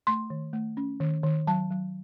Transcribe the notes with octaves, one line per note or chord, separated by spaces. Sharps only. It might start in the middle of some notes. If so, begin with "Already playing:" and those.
A3 C6
D#3
A3
C#4
D#3
D#3
F#3 A5
F#3